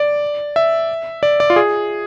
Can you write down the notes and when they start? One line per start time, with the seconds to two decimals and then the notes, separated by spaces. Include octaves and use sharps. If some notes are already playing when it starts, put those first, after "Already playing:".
Already playing: D5
0.56 E5
1.23 D5
1.40 D5
1.50 F4
1.56 G#4